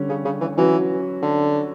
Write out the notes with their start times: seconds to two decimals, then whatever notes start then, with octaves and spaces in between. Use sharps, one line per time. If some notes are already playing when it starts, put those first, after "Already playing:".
Already playing: D3 G3 C#4
0.09 C#3
0.25 C#3
0.40 E3
0.57 E3 F#3 C#4 F#4 B4
1.22 D3